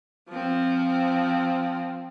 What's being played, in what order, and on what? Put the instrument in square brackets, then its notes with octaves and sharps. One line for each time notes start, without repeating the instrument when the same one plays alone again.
[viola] F3 C4